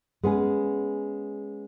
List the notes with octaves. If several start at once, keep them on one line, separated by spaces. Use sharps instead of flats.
G#3 B3 C#4 G#4